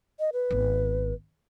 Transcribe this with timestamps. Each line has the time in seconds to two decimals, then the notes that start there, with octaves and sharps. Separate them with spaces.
0.20 D#5
0.33 B4
0.51 G#1 B3